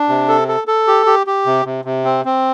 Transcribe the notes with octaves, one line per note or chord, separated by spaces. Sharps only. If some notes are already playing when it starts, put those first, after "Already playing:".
Already playing: D4
C3
A4
A4
A4
G4
G4
G4
C3
C3
C3
C4
C4